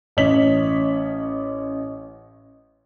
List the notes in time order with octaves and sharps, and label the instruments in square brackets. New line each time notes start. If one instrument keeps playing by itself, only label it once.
[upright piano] A1 C#4 C#5 D#5 B6 F#7